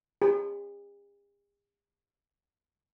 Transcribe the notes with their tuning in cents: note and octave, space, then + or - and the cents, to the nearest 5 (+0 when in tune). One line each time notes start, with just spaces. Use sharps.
G#4 -45